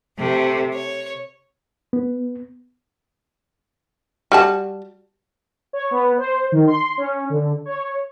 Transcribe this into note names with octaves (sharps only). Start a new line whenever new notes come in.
C3 A3
C#5
B3
G3 F#4 A5
C#5
B3
C5
D#3
C6
C#4
D3
C#5